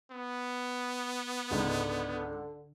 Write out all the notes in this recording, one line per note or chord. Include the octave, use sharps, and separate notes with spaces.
B3
C#2 G#2 D3